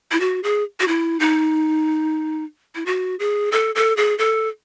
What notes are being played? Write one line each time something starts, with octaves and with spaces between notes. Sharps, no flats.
E4
F#4
G#4
F#4
E4
D#4
E4
F#4
G#4
A4
A4
G#4
A4